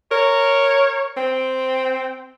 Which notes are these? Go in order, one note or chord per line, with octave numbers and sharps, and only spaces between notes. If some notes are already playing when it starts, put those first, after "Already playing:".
A#4 C#5
C4 G5